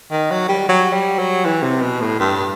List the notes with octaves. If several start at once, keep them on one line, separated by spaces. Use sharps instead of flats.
D#3
F#3
G3
F#3
G3
F#3
E3
C3
B2
A2
G2